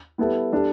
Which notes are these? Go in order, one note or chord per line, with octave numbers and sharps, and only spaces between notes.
G3 B3 E4 A4
G3 D4 A4